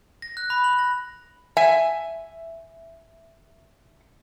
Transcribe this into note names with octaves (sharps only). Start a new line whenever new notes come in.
A#6
F#6
B5
F#7
A#6
E5 G#5